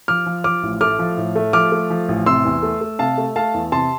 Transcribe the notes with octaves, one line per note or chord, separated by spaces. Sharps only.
F3 D6 F6
F3
F3 D6 F6
A1
A3 D6 F6
F3
A2
A3
F3 D6 F6
A3
F3
A1
C3 C6 E6
E2
A3
A3
C3 F5 A5
A3
A3 F5 A5
E2
C3 A5 C6